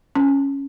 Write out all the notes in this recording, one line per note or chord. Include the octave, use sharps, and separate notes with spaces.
C#4